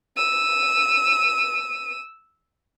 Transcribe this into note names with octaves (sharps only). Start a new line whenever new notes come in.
E6 D#7